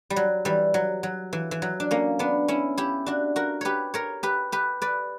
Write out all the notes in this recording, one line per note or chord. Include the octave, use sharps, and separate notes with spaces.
G3
F#3
E3 G3
F#3
F#3
E3
E3
F#3
D4
A#3 C#4
B3 D4
C#4 E4
E4 G4
D4 F#4
F#4 A#4
G4 B4 C#5
A#4 C#5
G4 B4
G4 B4
B4 D5